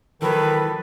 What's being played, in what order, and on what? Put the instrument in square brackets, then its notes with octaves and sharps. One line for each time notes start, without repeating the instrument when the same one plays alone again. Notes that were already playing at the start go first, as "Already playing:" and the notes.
[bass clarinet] D#3 [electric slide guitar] E3 F#3 [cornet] A4 [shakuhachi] B4